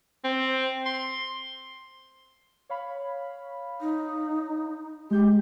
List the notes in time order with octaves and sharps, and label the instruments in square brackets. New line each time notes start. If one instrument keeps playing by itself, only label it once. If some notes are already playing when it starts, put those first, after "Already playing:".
[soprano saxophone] C4
C6
[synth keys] C#5 F5 B5
[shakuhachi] D#4
[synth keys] G#3 G6 [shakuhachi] G4